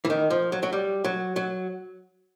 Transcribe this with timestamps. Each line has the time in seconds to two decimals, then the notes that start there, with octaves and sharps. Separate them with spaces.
0.05 E3
0.10 D#3
0.30 F3
0.52 F#3
0.63 F#3
0.73 G3
1.04 F#3
1.36 F#3